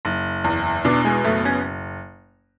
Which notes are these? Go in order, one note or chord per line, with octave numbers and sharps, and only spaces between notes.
F#1
E2
B2 D4
G#3
F#1 A3
C#4